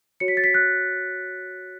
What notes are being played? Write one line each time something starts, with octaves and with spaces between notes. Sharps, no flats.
F#4 C#5 C#7
B6
A6
B6
F#6